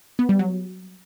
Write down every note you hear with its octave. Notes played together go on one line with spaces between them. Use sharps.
B3
G3
F#3